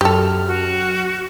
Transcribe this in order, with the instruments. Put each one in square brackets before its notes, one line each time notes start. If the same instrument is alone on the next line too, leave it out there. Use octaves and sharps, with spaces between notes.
[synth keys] F#2 F6 [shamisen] G4 A4
[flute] F#4